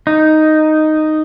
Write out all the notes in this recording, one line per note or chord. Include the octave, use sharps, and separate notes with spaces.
D#4